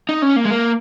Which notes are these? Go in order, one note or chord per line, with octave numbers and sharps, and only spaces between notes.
D#4
C#4
A#3
G#3
A#3